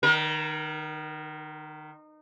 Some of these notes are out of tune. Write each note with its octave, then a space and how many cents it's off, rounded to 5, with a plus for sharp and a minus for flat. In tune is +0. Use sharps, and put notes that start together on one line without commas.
D#3 -25 A#4 +30